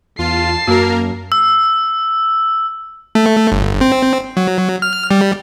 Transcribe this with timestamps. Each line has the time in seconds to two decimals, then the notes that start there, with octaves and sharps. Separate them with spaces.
0.19 E2 F4 A5 C7
0.67 F#2 A#3 F#4 A#4
1.32 E6
3.15 A3
3.52 G1
3.81 C4
4.37 F#3
4.82 F6
5.11 G3